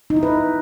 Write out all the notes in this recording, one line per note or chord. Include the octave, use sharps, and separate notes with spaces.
D#4
E4
B4